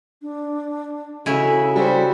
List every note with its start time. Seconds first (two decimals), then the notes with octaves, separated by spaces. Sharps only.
0.22 D4
1.26 C#3 E4 F#4 A4
1.76 G3 F#4 C5 G5